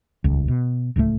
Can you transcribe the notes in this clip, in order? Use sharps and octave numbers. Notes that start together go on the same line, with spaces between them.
D#1 C#2
B2
D1 C#2 A2 A3